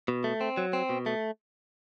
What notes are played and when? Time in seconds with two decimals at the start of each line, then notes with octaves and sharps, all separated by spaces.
0.08 B2
0.24 A3
0.41 C4
0.57 F#3
0.73 C4
0.89 B2
1.06 A3